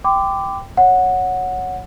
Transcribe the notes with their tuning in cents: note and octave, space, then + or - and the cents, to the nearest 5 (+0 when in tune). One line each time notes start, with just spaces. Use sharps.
G5 +0 B5 +45 D6 +0
C#5 +0 F#5 -10